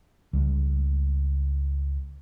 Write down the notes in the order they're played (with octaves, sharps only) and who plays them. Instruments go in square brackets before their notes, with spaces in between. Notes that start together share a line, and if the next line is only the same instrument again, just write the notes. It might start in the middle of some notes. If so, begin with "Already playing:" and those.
[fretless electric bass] C#2 G3